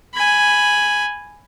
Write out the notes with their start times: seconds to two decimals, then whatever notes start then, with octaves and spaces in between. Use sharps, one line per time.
0.14 G#5 B5